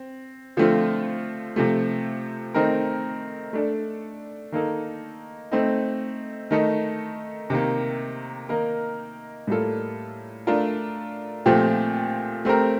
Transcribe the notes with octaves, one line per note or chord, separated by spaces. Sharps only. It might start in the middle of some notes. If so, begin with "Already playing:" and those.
Already playing: C4
D3 F3 A3 C4 F4
C3 F3 A3
D#3 A3 C4 D#4 A#4
A3 D4 A4
D#3 A#3 D#4 A4
A3 C4 D#4
D#3 A3 D#4 A4
C3 D#3 A#3
D#3 A#3 D#4 A#4
A2 G3 A#3 F4 A4
A3 D4 F4 A#4
A#2 F3 A3 C4 G4
A3 C4 G4 A#4